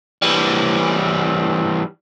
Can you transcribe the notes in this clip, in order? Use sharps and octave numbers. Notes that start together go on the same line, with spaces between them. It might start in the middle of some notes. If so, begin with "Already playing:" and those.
E3 G3